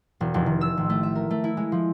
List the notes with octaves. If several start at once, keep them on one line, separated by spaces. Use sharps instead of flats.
E1
F1
D#3
E6
A1
A3
E5
A#4
A3
E4
G#3
F3